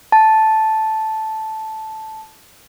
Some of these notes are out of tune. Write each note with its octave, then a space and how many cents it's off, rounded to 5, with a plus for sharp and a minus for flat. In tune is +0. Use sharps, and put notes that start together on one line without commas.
A5 -5